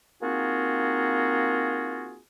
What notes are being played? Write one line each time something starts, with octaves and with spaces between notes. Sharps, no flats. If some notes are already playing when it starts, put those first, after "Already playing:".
A#3 C4 D#4 F4 F#4 G#4